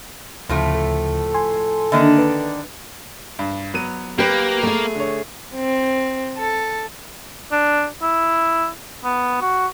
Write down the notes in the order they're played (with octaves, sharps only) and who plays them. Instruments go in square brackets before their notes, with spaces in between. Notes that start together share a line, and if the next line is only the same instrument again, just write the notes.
[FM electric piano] D2 C#3 [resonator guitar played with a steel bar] A2 F3 A3
[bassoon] A4
[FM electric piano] G#5 C6
[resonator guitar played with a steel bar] D3 D#3 D4 [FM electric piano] A#3 D#5 E5
[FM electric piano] B4
[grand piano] G2
F#3 B3 D#7
[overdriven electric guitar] A#3 [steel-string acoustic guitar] G4 B4
[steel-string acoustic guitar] A3 G#4
[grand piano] D3 C#5
[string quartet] C4
A4
[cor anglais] D4
E4
B3
F#4